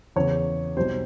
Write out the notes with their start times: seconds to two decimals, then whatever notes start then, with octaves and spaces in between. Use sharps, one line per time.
0.16 E2 C#3 E3 C#5
0.77 B1 B2 G3 C5